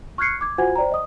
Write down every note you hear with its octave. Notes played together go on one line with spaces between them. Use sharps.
C#6 F6 F#6 G#6 C7 C#7
D6 G#6
F4 F#4 C5 F#5 G#5 G#6
C5 D5 G5 A#5
D#5 D#6